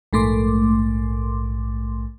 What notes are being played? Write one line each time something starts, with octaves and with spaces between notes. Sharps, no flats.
A#1 G#2 A3 C6 D6